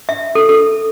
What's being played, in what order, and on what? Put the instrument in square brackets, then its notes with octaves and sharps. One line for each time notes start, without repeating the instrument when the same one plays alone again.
[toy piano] E5
A4
A4